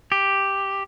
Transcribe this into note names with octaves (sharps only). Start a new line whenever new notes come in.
G4